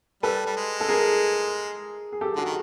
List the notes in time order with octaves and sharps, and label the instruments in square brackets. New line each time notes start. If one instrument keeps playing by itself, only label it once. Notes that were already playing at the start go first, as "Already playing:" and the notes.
[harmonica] G3 [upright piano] A4 B4
[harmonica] G3
G#3
[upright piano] A4
G#4 A#4
G#4
G4 A4
[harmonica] D3 [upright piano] F#4 G#4
[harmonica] D#3